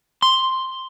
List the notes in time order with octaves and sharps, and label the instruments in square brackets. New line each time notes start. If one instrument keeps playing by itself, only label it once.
[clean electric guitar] C6